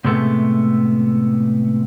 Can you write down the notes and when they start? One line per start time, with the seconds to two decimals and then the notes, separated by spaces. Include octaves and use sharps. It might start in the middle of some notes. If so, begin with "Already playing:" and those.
0.05 A2 C3 G#3 A3 B3